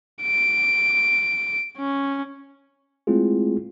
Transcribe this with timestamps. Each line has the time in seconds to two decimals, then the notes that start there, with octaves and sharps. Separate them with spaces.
0.22 D7
1.77 C#4
3.07 G#3 A3 C4 E4 F4 G#4